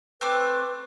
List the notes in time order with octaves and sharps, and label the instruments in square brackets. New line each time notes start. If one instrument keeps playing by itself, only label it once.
[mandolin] A3 C4 D6 [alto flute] B4